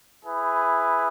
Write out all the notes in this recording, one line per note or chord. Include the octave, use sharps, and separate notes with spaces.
E4 G#4 B4